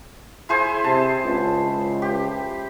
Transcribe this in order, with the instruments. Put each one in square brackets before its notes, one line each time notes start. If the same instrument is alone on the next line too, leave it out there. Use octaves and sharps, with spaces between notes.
[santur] E4 G#4 C5
[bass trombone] C3 [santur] A5
[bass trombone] C#2
[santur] G4